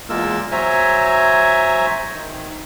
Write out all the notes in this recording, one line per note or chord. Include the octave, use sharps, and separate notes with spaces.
E2 G#3 A#3 F4 A#4 E6
F#3 C5 C#5 E5 G#5 A#5
D#3